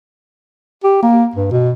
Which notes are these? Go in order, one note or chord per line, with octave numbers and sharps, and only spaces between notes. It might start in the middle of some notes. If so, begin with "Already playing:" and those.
G4
A#3
G2
B2